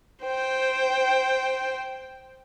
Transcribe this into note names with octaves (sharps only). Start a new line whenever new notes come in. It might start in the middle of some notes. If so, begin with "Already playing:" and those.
C5 G5